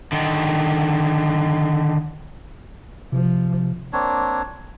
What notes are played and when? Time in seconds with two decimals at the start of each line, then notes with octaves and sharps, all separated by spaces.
0.12 D3 D#3
3.12 C3 F3
3.93 A#3 C4 D4 C#5